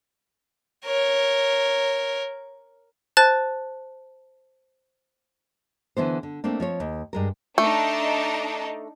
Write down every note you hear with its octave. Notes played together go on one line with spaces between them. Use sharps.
A#4 C#5
C5 A5 F#6 A6
D3 E3 B3 C5
D3
A3 A#3 C4 D4
F3 C4 C#5
D#2
G2 G#3 A#4
A3 D4 D#4